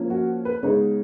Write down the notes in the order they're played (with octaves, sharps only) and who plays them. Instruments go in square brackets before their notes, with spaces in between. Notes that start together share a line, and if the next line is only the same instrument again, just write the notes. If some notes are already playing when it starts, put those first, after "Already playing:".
Already playing: [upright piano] F3 A#3 C#4
F#4
B4
C#3 G#3 B3 D#4 C#5